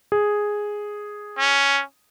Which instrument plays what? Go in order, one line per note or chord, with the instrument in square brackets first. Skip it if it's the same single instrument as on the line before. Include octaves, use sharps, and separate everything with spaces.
[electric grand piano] G#4
[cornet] C#4